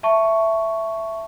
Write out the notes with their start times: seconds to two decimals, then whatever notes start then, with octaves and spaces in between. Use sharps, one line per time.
0.03 E5 A5 C#6